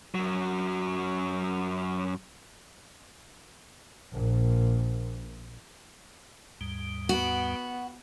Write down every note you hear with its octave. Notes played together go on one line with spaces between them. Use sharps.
F#2 F#3
A#1 A#2
D#2 G#2 G3
B3 F#4